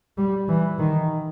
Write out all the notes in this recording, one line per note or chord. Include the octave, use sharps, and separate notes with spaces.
G3
E3
D#3